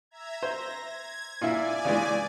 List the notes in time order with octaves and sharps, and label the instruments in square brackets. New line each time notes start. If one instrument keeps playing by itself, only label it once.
[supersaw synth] E5 A#5 G#6
[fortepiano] C5 [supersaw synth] A#6
[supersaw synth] G#6
[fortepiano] A#2 E4 [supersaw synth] D5 G#5
[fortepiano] C#3 E3 G#3